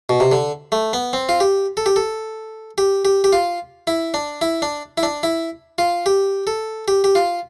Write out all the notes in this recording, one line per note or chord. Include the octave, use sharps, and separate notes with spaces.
B2
C3
D3
A3
B3
C4
F4
G4
A4
G4
A4
G4
G4
G4
F4
E4
D4
E4
D4
E4
D4
E4
F4
G4
A4
G4
G4
F4